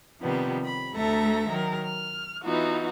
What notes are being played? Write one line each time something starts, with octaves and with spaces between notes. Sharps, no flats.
C3 D#3 F3 G3 B3
B5
D2 A3 A4 E5 A#5
D#3 F#3 A#4
F6
E3 B3 D#4 F4 F#4